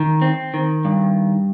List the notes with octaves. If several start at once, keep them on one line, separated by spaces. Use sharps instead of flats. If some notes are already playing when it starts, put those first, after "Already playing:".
Already playing: D#3
C4
D#3
G2